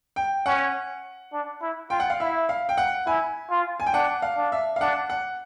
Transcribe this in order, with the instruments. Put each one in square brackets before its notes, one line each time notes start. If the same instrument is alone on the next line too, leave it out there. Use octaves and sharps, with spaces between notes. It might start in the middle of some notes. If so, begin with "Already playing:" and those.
[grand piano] G5
[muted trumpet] C#4 [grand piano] F#5
[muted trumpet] D4
E4
[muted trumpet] F4 [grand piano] G5
[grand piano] F#5
F5
[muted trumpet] E4 [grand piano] E5
[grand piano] F5
G5
F#5
[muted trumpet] E4 [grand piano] G#5
[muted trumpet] F4
[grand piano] G#5
G5
[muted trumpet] D4 [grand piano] F#5
[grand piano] F5
[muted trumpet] D4
[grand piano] E5
F5
[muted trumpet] D4 [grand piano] F#5
[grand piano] F#5